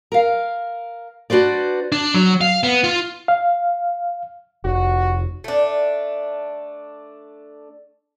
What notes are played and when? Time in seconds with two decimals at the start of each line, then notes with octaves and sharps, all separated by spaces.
0.12 A#4 F5
1.30 D4 F#4 B4 C5 D5
1.92 D4
2.14 F#3
2.41 F5
2.63 B3
2.84 F4
3.28 F5
4.64 F1 F#4
5.44 A3 D4